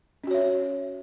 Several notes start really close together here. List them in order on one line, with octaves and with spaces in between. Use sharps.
C#4 F#4 C#5 E5